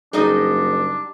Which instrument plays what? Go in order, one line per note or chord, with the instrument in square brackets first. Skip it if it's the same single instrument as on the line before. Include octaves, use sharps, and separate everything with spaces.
[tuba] F#1 [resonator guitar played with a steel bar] G3 D#4 D#5 [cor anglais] D4 [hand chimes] G#4